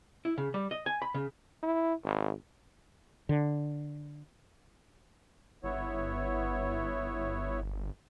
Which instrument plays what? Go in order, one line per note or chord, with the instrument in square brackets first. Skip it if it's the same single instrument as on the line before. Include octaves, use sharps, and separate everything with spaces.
[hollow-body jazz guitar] E4
C#3
G3
D#5
G#5
B5
C#3
[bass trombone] E4
G#1
[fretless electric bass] D3
[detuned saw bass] G1 [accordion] B3 E4 C#5